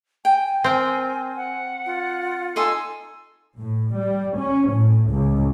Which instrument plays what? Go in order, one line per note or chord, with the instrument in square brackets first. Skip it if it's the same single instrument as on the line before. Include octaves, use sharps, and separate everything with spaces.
[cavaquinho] G5 [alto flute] G#5
[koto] C4 [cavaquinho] A#4 G5
[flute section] F#5
[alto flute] F4
[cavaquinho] D#4 D#5 C6 [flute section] A4 G#5 E6
[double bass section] A2
G3
C#4
A2
C#2